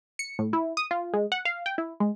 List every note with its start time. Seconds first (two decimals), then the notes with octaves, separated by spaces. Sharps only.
0.19 C#7
0.39 A2
0.53 E4
0.77 D#6
0.91 F4
1.14 G#3
1.32 F#5
1.45 F5
1.66 G5
1.78 E4
2.00 G#3